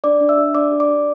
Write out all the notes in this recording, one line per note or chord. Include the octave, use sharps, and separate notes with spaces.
D4 D5 D6
D4
E5 E6
G4
D4 D5 D6
G4
D5 D6
G4